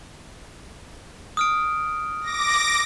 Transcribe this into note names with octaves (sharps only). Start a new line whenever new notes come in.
D#6 F6 D7
D6 A#6